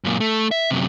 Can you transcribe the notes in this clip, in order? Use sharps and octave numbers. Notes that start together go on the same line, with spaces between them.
F#2 A#2
A3
E5
F#2 C3